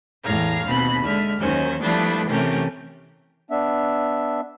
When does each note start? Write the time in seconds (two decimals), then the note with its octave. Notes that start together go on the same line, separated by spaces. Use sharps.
0.24 E2 A2 E3 F5 A#5 G#6
0.64 D#2 B2 C4 B5 F#6
1.04 D3 G#3 E5 F6
1.40 D#2 D#3 F#3 C#4 C5
1.82 F3 G3 A3 B3 D4 E4
2.28 C3 E3 A3 C#4 G4 A#4
3.51 B3 D4 E5